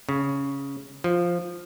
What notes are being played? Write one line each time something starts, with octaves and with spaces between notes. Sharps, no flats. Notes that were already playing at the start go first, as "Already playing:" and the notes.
C#3
F3